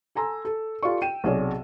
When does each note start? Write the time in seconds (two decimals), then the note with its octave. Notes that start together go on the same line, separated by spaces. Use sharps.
0.15 A4 G#5 A#5 C6 E6
0.45 A4
0.83 F4 G4 A4 D5 C#6
1.02 G5 D#7 E7
1.24 B1 C3 G#4 C#5 D5